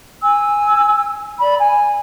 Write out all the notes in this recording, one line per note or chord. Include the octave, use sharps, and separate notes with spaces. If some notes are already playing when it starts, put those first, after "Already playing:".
G#5 E6
D5 B5
G#5